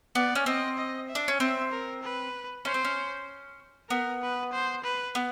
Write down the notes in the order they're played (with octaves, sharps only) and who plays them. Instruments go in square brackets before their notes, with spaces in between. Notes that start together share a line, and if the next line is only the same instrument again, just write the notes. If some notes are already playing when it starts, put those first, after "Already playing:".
[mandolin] B3 [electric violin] D5
[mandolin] C#4
[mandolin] C4 [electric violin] D#5
[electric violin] D#5
E5
[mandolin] D4
C#4
[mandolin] C4 [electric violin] E5
[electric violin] A#4
B4
[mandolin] C#4 [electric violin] C5
[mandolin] C4
C#4
[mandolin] B3 [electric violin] A#4
[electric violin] B4
C5
B4
[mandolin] B3